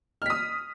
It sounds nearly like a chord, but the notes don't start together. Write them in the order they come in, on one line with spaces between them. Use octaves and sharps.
F6 B6 D#6